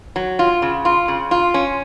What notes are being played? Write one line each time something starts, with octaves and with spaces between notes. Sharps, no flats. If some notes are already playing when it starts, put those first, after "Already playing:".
F#3
F4
C#3
F4
C#3
F4
C#4